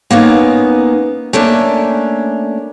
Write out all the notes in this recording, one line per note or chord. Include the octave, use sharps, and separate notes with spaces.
A#3 B3 C#4 D#4
A3 A#3 C#4 D4